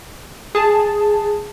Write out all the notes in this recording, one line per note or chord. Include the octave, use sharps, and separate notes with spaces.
G#4 A5